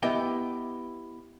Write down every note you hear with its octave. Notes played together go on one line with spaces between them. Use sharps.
B3 E4 G4 D#5 G5